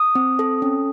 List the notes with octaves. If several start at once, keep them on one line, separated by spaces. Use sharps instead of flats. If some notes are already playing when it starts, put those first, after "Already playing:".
Already playing: D#6
C4
A4
C#4